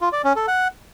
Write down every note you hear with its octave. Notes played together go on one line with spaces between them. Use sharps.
F4
D5
C#4
A4
F#5